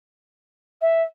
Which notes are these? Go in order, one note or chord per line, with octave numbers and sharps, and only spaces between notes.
E5